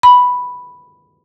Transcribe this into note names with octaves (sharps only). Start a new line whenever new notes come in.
B5